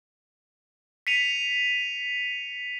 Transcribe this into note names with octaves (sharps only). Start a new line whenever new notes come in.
B6 C#7 D#7 F7